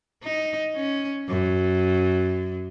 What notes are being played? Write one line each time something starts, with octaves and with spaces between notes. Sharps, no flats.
D#4
C#4
F#2